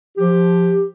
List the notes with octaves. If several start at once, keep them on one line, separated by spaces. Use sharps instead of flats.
F3 G4